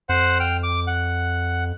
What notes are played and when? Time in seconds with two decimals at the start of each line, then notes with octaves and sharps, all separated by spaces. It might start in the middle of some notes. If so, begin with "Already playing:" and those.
0.09 F2 C5 F#5
0.40 G5 F6
0.63 D6
0.87 F#5